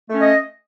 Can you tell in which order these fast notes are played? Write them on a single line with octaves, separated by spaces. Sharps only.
A3 C#4 D#5